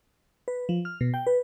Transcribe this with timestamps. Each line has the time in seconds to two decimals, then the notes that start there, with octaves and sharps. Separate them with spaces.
0.48 B4
0.69 F3
0.85 F6
1.01 B2
1.14 G5
1.27 B4